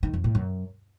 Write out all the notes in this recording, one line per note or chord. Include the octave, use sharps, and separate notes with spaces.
D#3
F2
A2
F#2